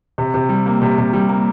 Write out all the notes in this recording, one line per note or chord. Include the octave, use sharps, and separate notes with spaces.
C3
C3
G3
A#3
C3
C3
G3
A#3